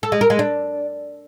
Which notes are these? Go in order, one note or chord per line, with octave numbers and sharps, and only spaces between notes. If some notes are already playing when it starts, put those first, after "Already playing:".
A4
G#3
A#4
G#3
D4